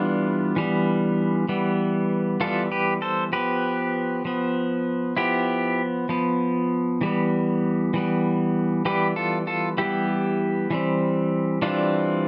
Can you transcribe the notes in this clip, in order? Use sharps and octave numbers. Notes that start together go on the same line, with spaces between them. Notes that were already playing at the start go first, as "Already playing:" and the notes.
Already playing: E3 G3 B3 D4 F4
E3 G3 B3
E3 G3 B3
E3 G3 B3 F4 A4
G4 B4
A4 C5
F3 B3 G4 B4
F3 B3
F3 B3 E4 G4
F3 B3
E3 G3 B3
E3 G3 B3
E3 G3 B3 G4 B4
F4 A4
F4 A4
E3 G3 B3 E4 G4
E3 G3 C4
E3 G3 C4 D4 F4